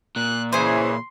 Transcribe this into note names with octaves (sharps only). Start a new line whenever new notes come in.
A#2 F#6
C#3 E3 G#4 C5 C6